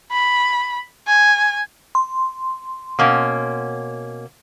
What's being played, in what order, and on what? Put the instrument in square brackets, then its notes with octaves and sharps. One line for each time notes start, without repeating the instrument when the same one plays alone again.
[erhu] B5
G#5
[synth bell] C6
[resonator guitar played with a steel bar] B2 A#3 C#4